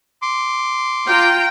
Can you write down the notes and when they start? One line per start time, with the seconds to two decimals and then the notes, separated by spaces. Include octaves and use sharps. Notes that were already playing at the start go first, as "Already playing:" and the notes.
0.22 C6 D6
1.08 F4 G5 A#5